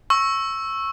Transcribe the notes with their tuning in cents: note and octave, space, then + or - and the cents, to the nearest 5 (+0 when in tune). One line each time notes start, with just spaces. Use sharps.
C#6 -15 E6 +0